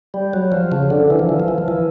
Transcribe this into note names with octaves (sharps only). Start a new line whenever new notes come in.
G3
F#3
F3
C#3
D3
E3
F3
E3
F3
E3
F3
E3